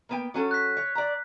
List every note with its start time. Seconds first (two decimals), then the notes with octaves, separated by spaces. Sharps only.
0.09 A#3 B3 G5
0.34 F#3 C#4 A4
0.51 F#6 B6
0.77 C#5
0.95 D5 A#5